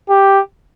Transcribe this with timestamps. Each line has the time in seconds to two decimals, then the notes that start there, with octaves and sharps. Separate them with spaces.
0.10 G4